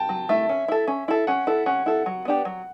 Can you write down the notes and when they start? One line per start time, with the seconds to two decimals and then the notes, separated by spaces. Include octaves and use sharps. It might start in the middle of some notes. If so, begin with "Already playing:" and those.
Already playing: G5 A5
0.09 F#3
0.29 A3 E4 E5
0.49 C#4
0.68 E4 A4
0.87 C#4
1.08 E4 A4
1.27 C#4 F#5
1.47 E4 A4
1.66 C#4 F#5
1.86 E4 A4
2.06 F#3
2.25 B3 D4 G4
2.45 F#3